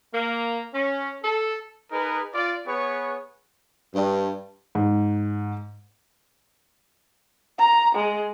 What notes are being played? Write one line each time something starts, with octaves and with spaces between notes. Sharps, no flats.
A#3
C#4
A4
D#4 G#4 A#4 B4
F4 D5
B3 G#4 B4 C#5 C#6
G2
G#2
A#5
G#3